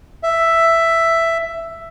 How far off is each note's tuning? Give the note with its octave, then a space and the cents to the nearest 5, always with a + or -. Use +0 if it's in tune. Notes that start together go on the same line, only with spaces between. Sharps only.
E5 +5